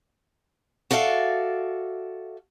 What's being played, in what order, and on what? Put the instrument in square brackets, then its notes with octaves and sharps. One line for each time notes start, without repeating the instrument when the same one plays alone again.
[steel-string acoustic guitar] F#4 A4 D5 E5 F5